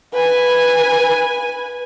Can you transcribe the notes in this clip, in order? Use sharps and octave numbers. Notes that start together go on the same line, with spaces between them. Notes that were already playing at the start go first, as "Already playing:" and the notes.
B4 G#5